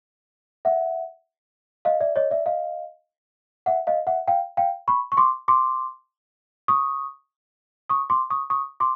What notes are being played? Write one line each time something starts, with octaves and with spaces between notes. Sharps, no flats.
E5 F#5
D#5 F5
D5 E5
C#5 D#5
D5 E5
D#5 F5
E5 F#5
D#5 F5
E5 F#5
F5 G5
F5 G5
B5 C#6
C#6
C6 D6
C6 D6
C#6 D#6
C#6 D#6
C6 D6
C#6 D#6
C#6 D#6
C6 D6